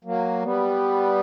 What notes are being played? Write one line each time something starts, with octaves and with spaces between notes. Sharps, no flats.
F#3 A#3
G3 B3